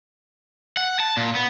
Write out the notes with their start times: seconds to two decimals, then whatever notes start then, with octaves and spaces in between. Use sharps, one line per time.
0.77 F#5
1.00 A5
1.17 A#2
1.35 B3